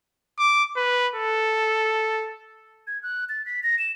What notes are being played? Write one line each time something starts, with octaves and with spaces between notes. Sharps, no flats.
D6
B4
A4
G#6
F#6
A6
B6
A#6
E7